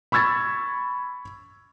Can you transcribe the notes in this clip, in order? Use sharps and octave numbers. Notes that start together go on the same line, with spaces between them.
B5 C#6 E6 G#6 A6